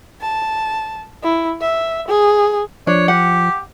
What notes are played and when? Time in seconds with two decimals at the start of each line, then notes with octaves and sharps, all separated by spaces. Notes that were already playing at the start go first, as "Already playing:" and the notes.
0.21 A5
1.23 E4
1.61 E5
2.08 G#4
2.87 F3 D4 C#5
3.08 G4 F#5